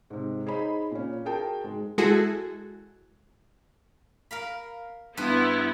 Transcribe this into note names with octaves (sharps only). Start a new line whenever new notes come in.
G#2 C3
D#4 G#4 C5 C#5 D#5 B5
A#2 C#4
F#4 G#4 A#4 G5 A5
G#2 G#3
G#3 E4 F#4 G#4 A4
A#4 F5 B5
G2 B3 E4 B4 C5